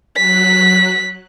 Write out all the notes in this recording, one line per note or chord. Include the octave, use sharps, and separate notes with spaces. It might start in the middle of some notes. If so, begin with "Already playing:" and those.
F#3 F#6 B6